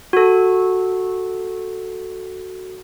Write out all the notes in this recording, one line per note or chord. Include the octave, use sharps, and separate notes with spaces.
F#4 A4